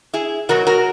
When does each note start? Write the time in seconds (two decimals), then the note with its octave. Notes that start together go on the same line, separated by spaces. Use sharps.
0.14 E4 G#4
0.49 B2 F#3 F#4 A#4
0.67 F#4 A#4